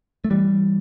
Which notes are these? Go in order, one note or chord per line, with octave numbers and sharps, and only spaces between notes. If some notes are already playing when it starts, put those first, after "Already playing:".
A3
E3 G3